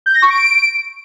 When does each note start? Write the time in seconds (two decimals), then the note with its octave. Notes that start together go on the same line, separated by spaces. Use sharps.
0.06 G6
0.14 A#6
0.22 C#6
0.30 D7